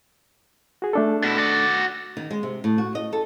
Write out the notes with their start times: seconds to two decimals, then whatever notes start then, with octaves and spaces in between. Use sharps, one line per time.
0.82 F#4 G#4
0.93 A3 D4 A4
1.24 B2 E4
1.38 F#4 D5
2.17 D#3
2.31 G#3
2.43 C3
2.64 A2
2.78 F#4
2.95 D#5
3.13 A4